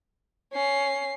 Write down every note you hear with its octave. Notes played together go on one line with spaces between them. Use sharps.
C#4 C7